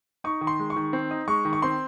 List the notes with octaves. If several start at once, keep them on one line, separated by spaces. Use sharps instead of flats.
D#4 C#6
D#3
C6
G#3
C#6
D#3
C4
D#4
G#3 C#6
D#3
C#6
C4 C6